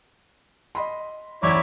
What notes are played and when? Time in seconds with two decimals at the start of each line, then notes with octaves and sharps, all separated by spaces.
0.75 D#5 B5 C6
1.43 A1 E2 E4 C#5 D5